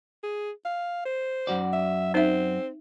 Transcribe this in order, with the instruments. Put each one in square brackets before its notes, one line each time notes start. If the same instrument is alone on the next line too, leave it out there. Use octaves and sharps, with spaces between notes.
[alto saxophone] G#4
F5
C5
[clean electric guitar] F#2 F#4 D5
[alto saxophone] E5
[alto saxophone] C4 [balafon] D#4 E5